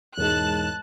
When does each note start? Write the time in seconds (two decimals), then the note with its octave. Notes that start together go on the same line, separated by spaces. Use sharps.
0.18 E1 G#2 A5 F#6